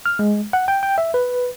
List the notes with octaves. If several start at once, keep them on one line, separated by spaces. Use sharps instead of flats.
F6
G#3
F#5
G5
G5
E5
B4